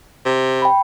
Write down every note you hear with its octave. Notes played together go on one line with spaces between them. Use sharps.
C3
G5 B5